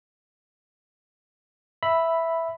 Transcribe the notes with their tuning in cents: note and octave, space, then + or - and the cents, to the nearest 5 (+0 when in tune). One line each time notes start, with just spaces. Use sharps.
E5 +0 B5 +0